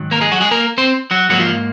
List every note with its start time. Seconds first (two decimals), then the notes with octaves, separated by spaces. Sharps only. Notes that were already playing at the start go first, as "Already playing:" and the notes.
Already playing: G#2 D#3 F#3
0.11 A#3 A#4
0.21 G#3 G#4
0.32 F#3 F#4
0.41 G#3 G#4
0.51 A#3 A#4
0.78 C4 C5
1.11 F#3 F#4
1.29 G#2 F3 F#3 A#3 F#4
1.40 F3 F4